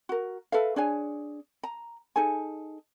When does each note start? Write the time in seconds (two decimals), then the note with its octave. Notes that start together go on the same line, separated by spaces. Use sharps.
0.09 F#4 A#4
0.52 A4 B4 E5 F5
0.76 D4 G#4 C#5 G#5
1.63 A#5
2.16 D#4 G#4 A4 G#5